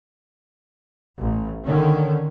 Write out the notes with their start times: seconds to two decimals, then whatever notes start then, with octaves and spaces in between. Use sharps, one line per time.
1.19 A1
1.66 D3 D#3 C#4